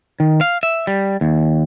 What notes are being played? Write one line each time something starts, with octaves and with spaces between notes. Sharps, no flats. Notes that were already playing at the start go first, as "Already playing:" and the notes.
D#3
F5
E5
G3
D#2